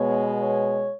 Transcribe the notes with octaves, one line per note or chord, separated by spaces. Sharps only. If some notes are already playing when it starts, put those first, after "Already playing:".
Already playing: B2 G#3 B3 C#5
C#5